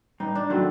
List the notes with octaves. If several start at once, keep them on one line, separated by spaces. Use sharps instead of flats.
G2 D#4
D4
D#3 F#3 A3 C4